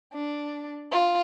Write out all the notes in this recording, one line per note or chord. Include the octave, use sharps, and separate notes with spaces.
D4
F4